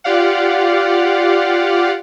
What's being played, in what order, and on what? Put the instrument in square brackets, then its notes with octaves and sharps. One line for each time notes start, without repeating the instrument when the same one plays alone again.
[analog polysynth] F4 G4 D5 F5 F#5